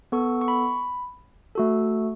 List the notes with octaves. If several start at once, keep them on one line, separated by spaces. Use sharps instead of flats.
B3 A4 C#6
C#6
B5
A3 F#4 A4